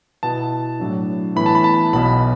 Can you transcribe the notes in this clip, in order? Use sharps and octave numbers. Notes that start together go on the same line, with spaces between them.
B2 B3 E4 A5
A2 F#3 D4
A2 E3 B3 B5
A5
B5
A5
B1 B2 B3 B5